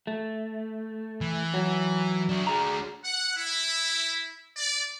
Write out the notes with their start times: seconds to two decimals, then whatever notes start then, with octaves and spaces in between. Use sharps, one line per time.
0.07 A3
1.21 E3
1.54 F#3
2.29 D4 F#4
2.47 G#4 A#5
3.04 F#5
3.36 E4
4.56 D5